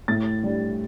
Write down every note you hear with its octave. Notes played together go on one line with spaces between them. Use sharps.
A2 A6
G3 D4